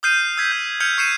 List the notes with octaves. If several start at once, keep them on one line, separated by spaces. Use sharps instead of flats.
D#6 F6 G6 C7 D#7
E6 G#6 B6
G6
F6 G6 G#6 C#7 D#7 F7
C#6 G6 C7 C#7 D#7 E7